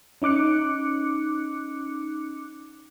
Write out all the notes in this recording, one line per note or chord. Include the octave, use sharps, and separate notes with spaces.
C#4 D#4 D6 F#6 C#7